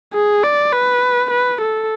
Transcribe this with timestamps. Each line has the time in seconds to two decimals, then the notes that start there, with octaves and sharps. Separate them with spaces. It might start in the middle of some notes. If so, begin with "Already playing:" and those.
0.14 G#4
0.44 D5
0.72 B4
1.31 B4
1.61 A4